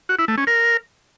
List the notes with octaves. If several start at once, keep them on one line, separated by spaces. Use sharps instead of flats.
F#4
E4
A3
C#4
A#4